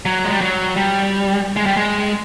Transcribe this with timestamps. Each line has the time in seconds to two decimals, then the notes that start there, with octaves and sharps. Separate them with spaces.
0.05 F#3
0.25 G#3
0.32 G3
0.41 F#3
0.76 G3
1.56 G#3
1.66 G3
1.77 G#3